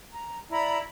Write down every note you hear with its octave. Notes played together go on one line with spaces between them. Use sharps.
A#5
E4 D5 A#5 B5